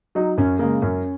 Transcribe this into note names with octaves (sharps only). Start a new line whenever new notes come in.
F#3 D#4
F#2 C#4
C#3 G#3 A#3
F#2 C#4